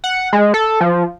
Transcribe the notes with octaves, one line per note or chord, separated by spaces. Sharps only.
F#5
G#3
A4
F3